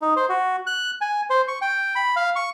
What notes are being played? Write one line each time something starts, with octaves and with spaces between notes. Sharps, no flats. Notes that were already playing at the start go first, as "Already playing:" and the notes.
D#4
C5
F#4
F#6
G#5
C5
C#6
G5
B5
F5
C#6